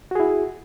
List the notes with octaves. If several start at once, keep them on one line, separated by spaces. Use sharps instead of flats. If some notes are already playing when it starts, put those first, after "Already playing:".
E4 F#4 G#4